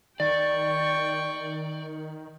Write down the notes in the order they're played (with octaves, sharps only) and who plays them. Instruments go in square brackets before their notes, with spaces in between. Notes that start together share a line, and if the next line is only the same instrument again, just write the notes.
[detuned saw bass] D#3 [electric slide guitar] D5 [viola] G5 C#6